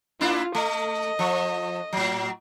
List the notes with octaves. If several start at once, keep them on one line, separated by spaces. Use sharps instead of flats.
A#3 D4 E4 F4
A3 D#5
F3
A2 F#3